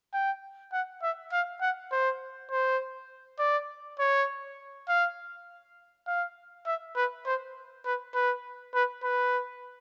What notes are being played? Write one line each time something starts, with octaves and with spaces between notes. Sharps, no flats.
G5
F#5
E5
F5
F#5
C5
C5
D5
C#5
F5
F5
E5
B4
C5
B4
B4
B4
B4